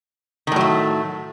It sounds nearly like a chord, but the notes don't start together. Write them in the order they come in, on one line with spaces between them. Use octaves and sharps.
D#3 A2 F#3 A3